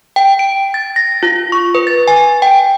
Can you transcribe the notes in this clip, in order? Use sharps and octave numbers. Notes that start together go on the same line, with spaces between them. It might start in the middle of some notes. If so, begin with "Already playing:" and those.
G5
D7
A6
A#6
F4
C#6
B4
A6
G#5
G5